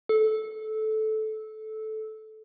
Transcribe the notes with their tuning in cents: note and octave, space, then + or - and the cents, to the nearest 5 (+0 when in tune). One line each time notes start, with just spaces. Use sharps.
A4 -15